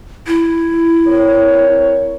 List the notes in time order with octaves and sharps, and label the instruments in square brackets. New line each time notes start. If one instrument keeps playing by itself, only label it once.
[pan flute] E4
[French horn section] C4 A#4 C#5